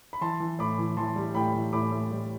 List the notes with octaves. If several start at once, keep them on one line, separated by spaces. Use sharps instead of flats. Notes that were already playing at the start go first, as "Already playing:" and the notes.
B5
E3 A5 C6
E3
A2 B5 D6
E3
E3 A5 C6
G3
A2 G5 B5
E3
A2 B5 D6
A2
G3